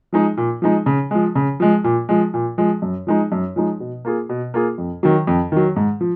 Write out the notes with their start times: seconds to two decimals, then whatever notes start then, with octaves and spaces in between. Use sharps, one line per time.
0.13 F3 G#3 D#4
0.37 A#2
0.62 F3 G#3 D#4
0.86 C#3
1.11 F3 G#3
1.35 C#3
1.60 F3 G#3
1.84 A#2
2.09 F3 G#3
2.34 A#2
2.58 F3 G#3
2.82 F#2
3.07 F3 G#3 D#4
3.32 F#2
3.56 F3 G#3 D#4
3.80 B2
4.05 A#3 F4 G#4
4.29 B2
4.54 A#3 F4 G#4
4.78 F2
5.03 D#3 F#3
5.27 F2
5.52 D#3 F#3
5.76 G#2
6.01 F3